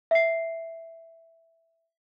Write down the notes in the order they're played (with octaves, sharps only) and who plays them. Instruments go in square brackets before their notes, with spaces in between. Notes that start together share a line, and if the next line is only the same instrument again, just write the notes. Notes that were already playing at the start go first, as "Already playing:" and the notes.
[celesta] E5 C7